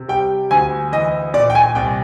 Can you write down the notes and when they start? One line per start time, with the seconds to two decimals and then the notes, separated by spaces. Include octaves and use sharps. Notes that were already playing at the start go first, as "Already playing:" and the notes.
Already playing: C3
0.08 G3 G5
0.51 D2 G#5
0.92 E3 D#5
1.34 A#2 D5
1.50 G5
1.55 G#5
1.75 C2 G5